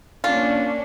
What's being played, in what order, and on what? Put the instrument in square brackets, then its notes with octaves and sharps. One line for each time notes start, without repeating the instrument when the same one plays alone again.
[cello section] A#3 C#4 D4 [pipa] F4